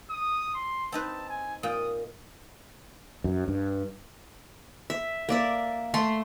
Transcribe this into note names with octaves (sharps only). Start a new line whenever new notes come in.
D#6
C6
C4 D#4 B4 A5
G#5
A#2 G5 D#6
F#2
G2
E5
A#3 D5 E5
A3 A4 C6